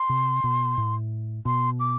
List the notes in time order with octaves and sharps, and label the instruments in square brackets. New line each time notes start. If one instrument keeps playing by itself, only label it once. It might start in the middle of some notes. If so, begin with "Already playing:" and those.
Already playing: [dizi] C6
[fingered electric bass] C3
B2
A2
[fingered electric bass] B2 [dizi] C6
[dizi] D6